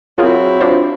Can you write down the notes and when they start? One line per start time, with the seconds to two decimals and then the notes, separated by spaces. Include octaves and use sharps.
0.18 F#3 C4 E4 F4 G#4 A#4
0.61 D4 F4 C5